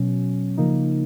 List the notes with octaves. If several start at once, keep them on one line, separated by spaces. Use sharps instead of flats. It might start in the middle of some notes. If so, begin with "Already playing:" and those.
Already playing: B2 F#3 C#4
C#3 F3 A#3 D#4